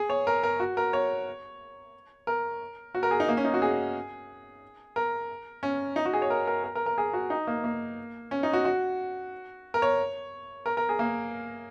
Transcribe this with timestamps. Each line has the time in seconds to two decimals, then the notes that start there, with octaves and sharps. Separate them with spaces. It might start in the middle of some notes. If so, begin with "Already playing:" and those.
Already playing: G#4
0.09 C#5
0.27 A#4
0.43 A#4
0.60 F#4
0.77 A#4
0.93 C#5
2.27 A#4
2.95 F#4
3.03 A#4
3.11 G#4
3.20 D#4
3.29 A#3
3.37 C#4
3.44 D#4
3.54 F#4
3.62 G#4
4.96 A#4
5.63 C#4
5.96 D#4
6.05 F#4
6.13 G#4
6.22 C#5
6.30 A#4
6.47 A#4
6.64 A#4
6.75 A#4
6.86 A#4
6.98 G#4
7.13 F#4
7.30 D#4
7.47 A#3
7.64 A#3
8.31 C#4
8.43 D#4
8.53 F#4
8.65 F#4
9.74 A#4
9.82 C#5
10.66 A#4
10.77 A#4
10.89 G#4
10.99 A#3